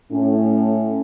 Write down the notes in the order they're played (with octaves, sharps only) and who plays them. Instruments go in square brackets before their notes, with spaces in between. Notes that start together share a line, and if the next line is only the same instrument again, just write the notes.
[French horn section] A2 C#4